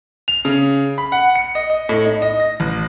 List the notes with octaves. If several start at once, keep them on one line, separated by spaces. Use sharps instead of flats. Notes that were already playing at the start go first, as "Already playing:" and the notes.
F7
C#3
B5
F#5
C#7
D#5
D#5
A2
D#4
D#5
A#6
A1